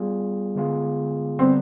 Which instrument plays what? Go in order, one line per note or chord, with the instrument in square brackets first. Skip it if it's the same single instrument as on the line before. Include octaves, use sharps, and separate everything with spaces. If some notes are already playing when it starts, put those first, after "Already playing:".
Already playing: [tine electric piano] G3 B3 F4 G#4
D3 G#3 B3 F4 G#4
[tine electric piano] D3 G3 B3 [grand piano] C4